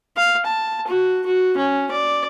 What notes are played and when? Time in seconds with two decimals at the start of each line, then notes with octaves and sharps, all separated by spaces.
0.17 F5
0.45 A5
0.87 F#4
1.26 F#4
1.57 C#4
1.91 D5